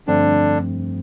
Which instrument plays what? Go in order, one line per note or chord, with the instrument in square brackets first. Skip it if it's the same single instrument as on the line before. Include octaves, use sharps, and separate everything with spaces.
[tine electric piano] G2 F3 A3 C4 [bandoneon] D3 D4